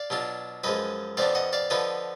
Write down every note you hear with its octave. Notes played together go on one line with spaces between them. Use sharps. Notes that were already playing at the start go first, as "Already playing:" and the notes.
Already playing: D5 F5
B2 F#3 D4 F4
F#2 F3 G#3 B4 D#5
F2 F3 B3 D4 D5 F5
D#5 F#5
D5 F5
D3 F3 B3 F4 B4 D#5